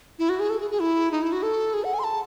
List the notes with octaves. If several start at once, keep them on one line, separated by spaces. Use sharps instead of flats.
E4
F#4
G#4
A4
G#4
G#4
E4
D#4
E4
F#4
A4
G#4
F#5
G#5
C6
A5